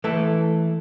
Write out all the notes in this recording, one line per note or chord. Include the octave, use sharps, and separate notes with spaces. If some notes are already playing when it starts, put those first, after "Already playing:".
E3 A3 E4 A4